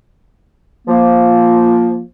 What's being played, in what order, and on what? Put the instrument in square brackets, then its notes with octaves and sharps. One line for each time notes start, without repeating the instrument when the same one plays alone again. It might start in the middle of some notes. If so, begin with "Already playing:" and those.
[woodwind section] F3 A#3